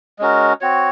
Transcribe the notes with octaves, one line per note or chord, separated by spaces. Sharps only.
G#3 C#4 F#4 A#4
C4 F#4 C#5